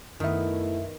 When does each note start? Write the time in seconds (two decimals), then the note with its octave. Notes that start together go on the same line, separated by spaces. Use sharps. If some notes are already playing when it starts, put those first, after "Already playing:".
0.20 F#2 D#3 A3 B3 E4 E5